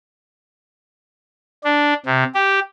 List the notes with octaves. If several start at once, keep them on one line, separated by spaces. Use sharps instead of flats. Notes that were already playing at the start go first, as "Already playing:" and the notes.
D4
C3
G4